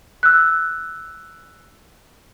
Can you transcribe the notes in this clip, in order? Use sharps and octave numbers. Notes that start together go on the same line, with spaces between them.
E6 F#6